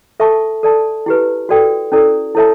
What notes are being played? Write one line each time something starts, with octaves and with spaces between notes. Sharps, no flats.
A4 E5 A5 C#6
A4 D5 A5
E4 G4 B4
F#4 A4 D5 G5
C#4 E4 A4 D5
E4 A4 C#5 E5 A5